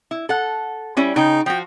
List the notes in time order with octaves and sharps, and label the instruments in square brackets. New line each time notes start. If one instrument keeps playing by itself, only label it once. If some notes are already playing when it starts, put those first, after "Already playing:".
[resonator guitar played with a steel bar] E4
A4 F#5
G3 C#4 E4
[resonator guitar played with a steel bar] C#3 G5 [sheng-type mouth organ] D#4
[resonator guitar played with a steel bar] F3 F#4 [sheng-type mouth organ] G5